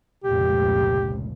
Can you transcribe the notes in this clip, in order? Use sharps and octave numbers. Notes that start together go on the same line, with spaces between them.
F1 C#2 A#2 G4